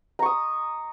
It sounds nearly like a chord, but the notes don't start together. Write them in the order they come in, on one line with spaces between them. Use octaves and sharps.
A#5 C#6 D#6